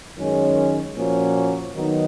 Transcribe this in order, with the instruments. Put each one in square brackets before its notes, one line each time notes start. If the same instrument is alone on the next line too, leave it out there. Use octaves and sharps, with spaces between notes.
[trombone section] F#2 D#3 G#3 C#4
A#2 F3 A#3 C#4 F#4
D#3 F#3 B3 D#4